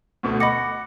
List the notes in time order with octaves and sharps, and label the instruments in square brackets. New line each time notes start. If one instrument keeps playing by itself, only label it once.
[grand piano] D2 B2 A3
[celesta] D#5 A#6 C#7 [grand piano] F#5 [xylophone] B5 D6